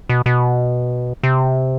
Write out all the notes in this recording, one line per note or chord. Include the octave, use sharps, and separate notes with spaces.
B2
B2
C3